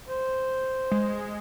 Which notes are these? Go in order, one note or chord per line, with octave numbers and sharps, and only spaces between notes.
C5
G#3